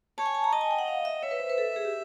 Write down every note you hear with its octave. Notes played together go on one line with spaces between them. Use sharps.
C#5 A5
G#5
A5
A#5
D#5 A5
G#5
G5
F#5
F5
E5
C#5 E5
B4
C5
B4
A4
G#4
G4